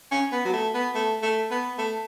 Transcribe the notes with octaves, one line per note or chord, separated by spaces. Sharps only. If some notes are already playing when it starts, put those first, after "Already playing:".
C#4
B3
F#3
A3
B3
A3
A3
B3
A3